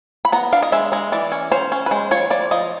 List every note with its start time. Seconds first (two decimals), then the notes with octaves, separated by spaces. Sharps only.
0.25 B5
0.32 B3 A#5
0.52 D4 F5
0.63 D#5
0.72 G#3 E5
0.92 G#3 D#5
1.12 E3 D5
1.32 C#4
1.51 C#4 C5
1.72 C#4
1.86 B4
1.91 G#3 C5
2.11 F3 C#5
2.30 F3 D5
2.51 F3 D#5